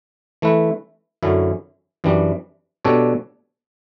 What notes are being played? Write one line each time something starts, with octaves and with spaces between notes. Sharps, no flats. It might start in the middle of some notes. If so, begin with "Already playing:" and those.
E3 A3 E4 B4
F#2 D3 F#3 C#4 E4
F#2 E3 G3 D4
B2 G3 D4 A4 C#5